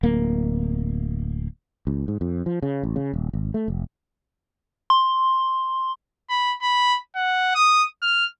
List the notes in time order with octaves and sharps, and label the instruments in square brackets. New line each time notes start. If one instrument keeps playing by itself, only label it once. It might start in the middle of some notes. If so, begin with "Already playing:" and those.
[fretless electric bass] D1 A#3
C#2
G#2
F2
F3
C#3
A1
C#3
D#1
G#1
A3
F1
[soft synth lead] C6
[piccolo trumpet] B5
B5
F#5
D#6
F6